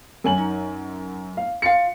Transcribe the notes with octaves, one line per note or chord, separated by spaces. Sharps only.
F#2 G#5 F#7
D#4
F5
F4 F5 C#7